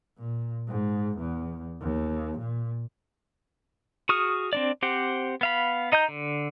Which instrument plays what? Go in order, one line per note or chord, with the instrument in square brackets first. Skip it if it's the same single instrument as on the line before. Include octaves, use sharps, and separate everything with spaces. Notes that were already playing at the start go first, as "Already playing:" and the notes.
[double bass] A#2
G#2
E2
D#2
A#2
[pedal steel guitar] F#4 G#4 C#6 D#6 F6
C4 D4 D5
C4 G4 C5 F#5
B3 F5 B5
D#4 D#5 A#5 G6
D3